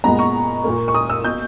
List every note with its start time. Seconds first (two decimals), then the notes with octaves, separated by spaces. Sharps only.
0.04 A#2 G#3 B3 A#5
0.19 C#6
0.64 A#2 A#3
0.88 C#6
0.95 D#6
1.10 E6
1.24 B2 A#3 G6